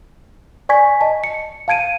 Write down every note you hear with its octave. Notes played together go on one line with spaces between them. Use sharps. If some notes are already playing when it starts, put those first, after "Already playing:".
D5 G#5 C#6 G#6 B6
D#5 A5
C#7
F5 A5 G#6 D7 D#7